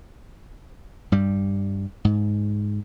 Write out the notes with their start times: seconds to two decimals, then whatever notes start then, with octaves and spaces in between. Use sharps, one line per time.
1.12 G2 G3
2.05 G#2